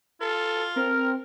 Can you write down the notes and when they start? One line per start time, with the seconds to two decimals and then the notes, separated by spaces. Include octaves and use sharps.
0.21 F4 A4
0.76 C4 A#4 F6